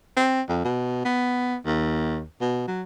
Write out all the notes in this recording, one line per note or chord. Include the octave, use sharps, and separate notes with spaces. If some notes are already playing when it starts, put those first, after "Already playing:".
C4
F2
B2
B3
D#2
B2
F#3